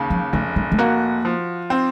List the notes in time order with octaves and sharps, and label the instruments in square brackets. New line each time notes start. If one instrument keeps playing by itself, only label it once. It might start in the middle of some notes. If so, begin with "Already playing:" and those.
Already playing: [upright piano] D#2 C#3
[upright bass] F3
[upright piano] F1 [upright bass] A3
[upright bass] A#3
A3
[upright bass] A#3 [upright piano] F#4
[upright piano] F3
C4